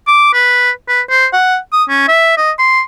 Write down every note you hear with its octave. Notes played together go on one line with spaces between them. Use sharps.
D6
B4
B4
C5
F#5
D#6
C#4
E5
D#5
C6